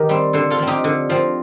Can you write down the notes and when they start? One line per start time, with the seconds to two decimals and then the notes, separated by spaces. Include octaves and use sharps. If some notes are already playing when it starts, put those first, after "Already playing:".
Already playing: D#3 G4 A#4
0.09 G3 C4
0.33 D3 A4 C5
0.50 F4 A4
0.59 F3 C4
0.67 D#4 G4
0.84 D3
1.10 F3 C4